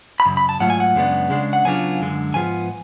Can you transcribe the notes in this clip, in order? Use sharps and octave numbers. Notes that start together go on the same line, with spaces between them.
B5
F#2 C#3
B5
A5
G#2 F#3 A3 F4 F#5
G#5
F#5
F#2 C#3 G#3 B3 D4
C#3 G#3 D4
F#5
C#3 F#3 B3 D4 F4 G#5
F#2 D3 G#3
G#2 F3 B3 F4 G#5